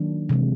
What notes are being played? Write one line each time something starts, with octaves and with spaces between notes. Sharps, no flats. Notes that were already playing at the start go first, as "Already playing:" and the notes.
Already playing: D#3 F#3 A#3 D4
C3 E3 G#3